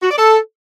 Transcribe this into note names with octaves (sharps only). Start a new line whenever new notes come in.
F#4
D5
A4